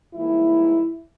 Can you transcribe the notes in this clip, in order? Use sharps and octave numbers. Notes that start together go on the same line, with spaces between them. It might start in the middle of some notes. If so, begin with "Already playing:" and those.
G#2 E3 G3 A#3 E4